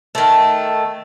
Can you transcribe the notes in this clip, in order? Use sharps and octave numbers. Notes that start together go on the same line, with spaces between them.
D#3 A3